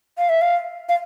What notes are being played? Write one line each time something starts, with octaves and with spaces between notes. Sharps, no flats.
F5
E5
F5
F5